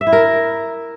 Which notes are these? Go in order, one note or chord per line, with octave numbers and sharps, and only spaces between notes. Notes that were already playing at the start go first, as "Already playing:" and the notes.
E5
E4
A#4